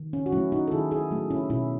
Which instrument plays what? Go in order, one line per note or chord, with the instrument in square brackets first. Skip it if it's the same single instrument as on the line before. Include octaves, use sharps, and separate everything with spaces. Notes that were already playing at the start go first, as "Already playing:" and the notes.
Already playing: [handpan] D#3
C#4
F#4
F#3 C#4 E4
A3
D#4 F#4
A4
D#3 E4 G#4
E4 G#4
F#3 A3
C#4 E4
B2 C#4 E4